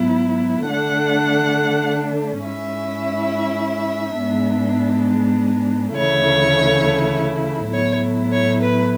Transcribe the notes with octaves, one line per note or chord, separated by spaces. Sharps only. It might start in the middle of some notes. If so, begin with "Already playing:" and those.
Already playing: G#2 F#3 B3 E4
D3 A3 D4 F#5
G#2 G#3 C#4 E4 E5
G#2 G#3 B3 D4
D2 C#3 E3 A3 E4 C#5
A2 F#3 B3 E4 C#5
C#5
B4